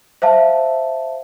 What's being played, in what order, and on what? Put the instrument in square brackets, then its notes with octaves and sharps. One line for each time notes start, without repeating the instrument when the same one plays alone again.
[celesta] C5 E5 F5 A5